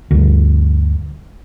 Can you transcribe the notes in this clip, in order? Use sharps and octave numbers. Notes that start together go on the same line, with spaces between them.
D2 G2